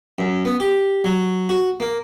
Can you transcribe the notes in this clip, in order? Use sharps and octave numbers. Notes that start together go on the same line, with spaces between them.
F#2
B3
G4
F#3
F#4
A#3